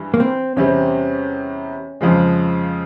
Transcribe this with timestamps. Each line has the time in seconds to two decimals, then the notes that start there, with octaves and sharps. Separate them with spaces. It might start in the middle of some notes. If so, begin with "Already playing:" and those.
Already playing: G2 E3
0.14 A#3
0.20 C4
0.56 E2 C3 G3 C4 C#4
2.01 F2 C#3 F3 G#3